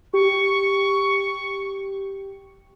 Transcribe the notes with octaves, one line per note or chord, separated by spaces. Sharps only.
G4 C#6